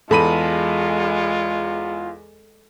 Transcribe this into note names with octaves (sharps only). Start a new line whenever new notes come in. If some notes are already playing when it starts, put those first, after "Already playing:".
E2 G#3 F4 A4 B5 D#7